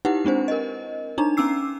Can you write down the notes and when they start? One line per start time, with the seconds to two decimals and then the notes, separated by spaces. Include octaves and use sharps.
0.05 D#4 E4 G4 B4 F#5
0.25 G#3 C4 D4 C5
0.48 A#4 D#5
1.18 D4 D#4 A#5
1.37 B3 C#4 D6 E6 C7